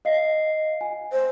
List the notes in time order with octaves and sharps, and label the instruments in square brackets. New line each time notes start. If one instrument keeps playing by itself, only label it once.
[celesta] D#5 F5 C7
G#5
[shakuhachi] C5